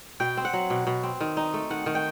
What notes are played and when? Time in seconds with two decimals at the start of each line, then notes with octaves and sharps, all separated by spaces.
0.20 B2 G5
0.37 C4
0.45 F#5
0.53 F#3
0.70 B2
0.87 B2
1.03 C4
1.21 D#3
1.37 D#4
1.54 A3
1.70 D#3 F#5
1.86 D#3
1.95 G5